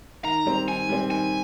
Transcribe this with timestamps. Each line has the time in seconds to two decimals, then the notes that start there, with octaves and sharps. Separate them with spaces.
0.24 D#3 A#5
0.46 G3 C4
0.68 D#3 G#5
0.89 G3 C4
1.11 D#3 G#5